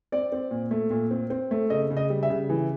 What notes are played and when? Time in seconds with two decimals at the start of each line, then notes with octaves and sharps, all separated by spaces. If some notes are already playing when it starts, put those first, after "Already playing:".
0.12 C4 D5
0.32 C4
0.51 A#2
0.71 A3
0.91 A#2
1.11 C4
1.30 C4
1.51 A3
1.70 C#3 D#5
1.90 C#3
1.97 D#5
2.10 G3
2.23 E5
2.30 C#3
2.49 E3